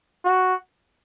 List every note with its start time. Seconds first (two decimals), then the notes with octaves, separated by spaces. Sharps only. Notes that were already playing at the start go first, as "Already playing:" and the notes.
0.25 F#4